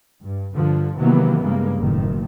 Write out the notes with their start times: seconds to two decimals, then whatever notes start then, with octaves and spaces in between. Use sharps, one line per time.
0.22 G2
0.55 G2 D3 F3
0.98 C3 D#3 E3 F#3 A#3 B3
1.42 G2 C#3 G#3 A#3
1.79 F#1 A2 D#3